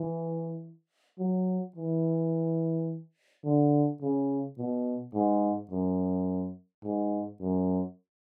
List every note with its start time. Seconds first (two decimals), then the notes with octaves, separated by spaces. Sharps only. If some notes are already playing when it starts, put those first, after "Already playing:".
Already playing: E3
1.19 F#3
1.76 E3
3.45 D3
4.01 C#3
4.58 B2
5.14 G#2
5.71 F#2
6.84 G#2
7.41 F#2